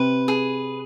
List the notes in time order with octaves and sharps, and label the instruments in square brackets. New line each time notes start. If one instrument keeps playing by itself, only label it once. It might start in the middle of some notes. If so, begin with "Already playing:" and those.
Already playing: [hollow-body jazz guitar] C3 [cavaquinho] B4
[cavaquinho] G#4